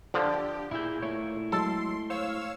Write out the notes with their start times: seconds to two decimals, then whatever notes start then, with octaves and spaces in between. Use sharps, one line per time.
0.14 D3 F3 D4 F4 G4
0.71 A#2 E4 G#4 B5 E6 G6
1.02 A3 E4 C#5
1.52 F#3 G#3 A4 C6
2.10 C5 C#5 F5 E6